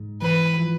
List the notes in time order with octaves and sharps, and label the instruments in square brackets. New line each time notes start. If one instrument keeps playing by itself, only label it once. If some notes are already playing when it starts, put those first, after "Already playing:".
Already playing: [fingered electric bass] G#2
[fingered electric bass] E3 [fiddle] B4
[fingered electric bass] F3